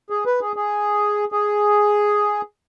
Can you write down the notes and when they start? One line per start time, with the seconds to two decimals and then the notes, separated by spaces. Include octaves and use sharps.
0.10 G#4
0.26 B4
0.41 G#4
0.56 G#4
1.32 G#4